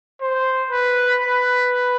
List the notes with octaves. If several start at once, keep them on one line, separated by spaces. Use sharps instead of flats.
C5
B4
B4